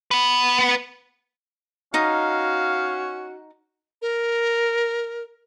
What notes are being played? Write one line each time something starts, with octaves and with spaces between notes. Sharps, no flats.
B3 B4
C#4 D#4 F#4 F5 D#6
A#4